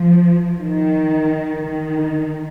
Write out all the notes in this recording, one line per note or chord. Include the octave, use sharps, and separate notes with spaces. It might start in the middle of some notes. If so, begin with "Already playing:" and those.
Already playing: F3
D#3
D#3